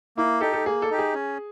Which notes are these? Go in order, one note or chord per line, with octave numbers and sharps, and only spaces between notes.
A#3 E4
D#4 G4 A4
A4
A#3 G#4
A4
D#4 G4
G#4
C#4